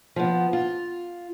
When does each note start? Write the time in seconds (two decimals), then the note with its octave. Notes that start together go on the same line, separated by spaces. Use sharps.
0.16 F3 B3
0.53 F4